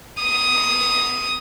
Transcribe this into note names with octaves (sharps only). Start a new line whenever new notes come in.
D#6